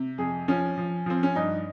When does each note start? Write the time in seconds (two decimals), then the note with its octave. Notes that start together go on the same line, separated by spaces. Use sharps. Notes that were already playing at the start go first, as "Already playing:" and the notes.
Already playing: C3
0.18 F2 G#4
0.48 F3 C#4
0.78 F3
1.06 F3 C4
1.23 C#4
1.35 G2 D#4